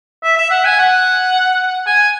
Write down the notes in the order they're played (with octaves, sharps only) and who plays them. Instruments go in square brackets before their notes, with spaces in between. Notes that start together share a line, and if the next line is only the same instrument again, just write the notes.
[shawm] E5
E5
F#5
G#5
F#5
G#5